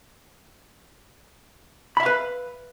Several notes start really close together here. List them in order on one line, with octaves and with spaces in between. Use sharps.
B5 E5 F5 B4